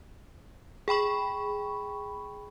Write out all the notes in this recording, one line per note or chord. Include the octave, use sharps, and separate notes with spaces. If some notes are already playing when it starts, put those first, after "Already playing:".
G#4 G5 B5 C#6